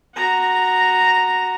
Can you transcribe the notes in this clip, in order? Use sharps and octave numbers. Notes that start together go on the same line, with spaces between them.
F#4 A#5